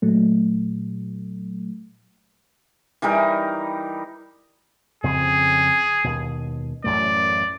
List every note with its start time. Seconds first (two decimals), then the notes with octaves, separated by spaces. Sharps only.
0.02 A#2 F#3 A3
3.02 E3 G3 D#4 A#4
5.03 F2 C#3 C4 G#4
6.04 D#2 B2
6.84 A1 F#2 A3 D5